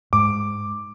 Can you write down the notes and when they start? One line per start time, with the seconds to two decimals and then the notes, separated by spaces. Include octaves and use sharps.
0.13 G#2 D6